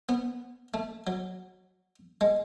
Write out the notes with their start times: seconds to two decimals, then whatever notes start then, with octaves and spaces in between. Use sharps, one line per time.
0.09 B3
0.74 A3
1.07 F#3
2.21 G#3